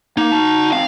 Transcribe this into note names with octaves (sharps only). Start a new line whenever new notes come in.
A#3 D#4
F#4 A5
C4 D#4 F5